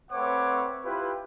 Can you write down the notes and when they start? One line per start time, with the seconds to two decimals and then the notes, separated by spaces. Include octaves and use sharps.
0.12 A3 C4 B4 C#5 F#5 D6
0.84 E4 F4 G4 B4